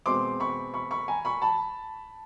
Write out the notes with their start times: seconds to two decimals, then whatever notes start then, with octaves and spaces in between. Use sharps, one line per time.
0.06 B2 G#3 C4 C6 D6
0.40 B5 C#6
0.74 B5 C#6
0.91 B5 C#6
1.08 G#5 A#5
1.25 B5 C#6
1.42 A5 B5